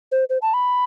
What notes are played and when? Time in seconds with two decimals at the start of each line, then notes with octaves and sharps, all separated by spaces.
0.12 C5
0.30 C5
0.42 A5
0.54 B5